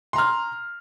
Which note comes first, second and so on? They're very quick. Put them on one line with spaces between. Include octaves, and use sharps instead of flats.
C6 A#5 F6